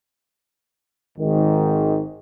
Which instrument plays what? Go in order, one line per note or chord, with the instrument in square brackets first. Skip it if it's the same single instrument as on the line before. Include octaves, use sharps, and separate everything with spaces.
[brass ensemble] G#1 G#2 D#3